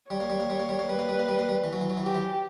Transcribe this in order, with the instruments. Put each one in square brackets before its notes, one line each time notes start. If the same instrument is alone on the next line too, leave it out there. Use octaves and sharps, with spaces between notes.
[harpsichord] G3 [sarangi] C#5
[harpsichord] A#3
G3
A#3
G3
A#3
G3
A#3
[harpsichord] G3 [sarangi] B4
[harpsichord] A#3
G3
A#3
G3
A#3
G3
E3
F#3
E3
F#3
E3
[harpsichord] F#3 [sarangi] G4
[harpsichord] E3